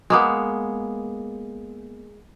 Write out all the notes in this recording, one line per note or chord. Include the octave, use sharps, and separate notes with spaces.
G#3 A#3 B3